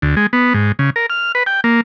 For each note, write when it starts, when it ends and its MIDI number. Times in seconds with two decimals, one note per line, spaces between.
0.02 0.15 38
0.16 0.27 56
0.33 0.53 59
0.54 0.72 44
0.79 0.90 49
0.96 1.06 70
1.10 1.32 89
1.35 1.43 71
1.46 1.61 79
1.64 1.81 58